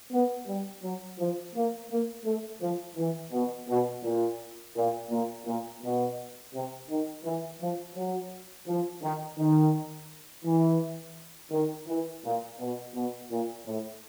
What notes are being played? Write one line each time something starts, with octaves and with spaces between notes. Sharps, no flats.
B3
G3
F#3
F3
A#3
A#3
A3
F3
E3
B2
B2
A#2
A#2
A#2
A#2
B2
C3
D#3
E3
F3
F#3
F3
D#3
D#3
E3
D#3
E3
A#2
B2
B2
A#2
A2